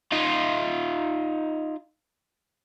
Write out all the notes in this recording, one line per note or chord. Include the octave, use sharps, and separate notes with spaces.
D#4 F4